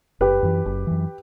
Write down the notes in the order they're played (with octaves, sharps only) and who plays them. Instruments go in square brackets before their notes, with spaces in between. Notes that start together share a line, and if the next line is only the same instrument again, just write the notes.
[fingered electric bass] F#1 [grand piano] G4 B4
[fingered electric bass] F#2 E3
F#1
F#2 E3